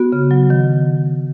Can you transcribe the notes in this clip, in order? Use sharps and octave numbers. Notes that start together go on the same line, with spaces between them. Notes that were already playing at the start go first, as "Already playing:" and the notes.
Already playing: B3 F#4
C#3
F#3
D#3